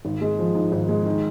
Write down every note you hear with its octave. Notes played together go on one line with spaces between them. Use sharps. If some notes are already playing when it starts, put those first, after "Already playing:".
G#1
G#3
F3
G#2
G#1
G#3
D#3